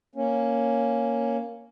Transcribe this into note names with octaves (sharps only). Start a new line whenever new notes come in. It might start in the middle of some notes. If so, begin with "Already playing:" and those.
A#3 C#4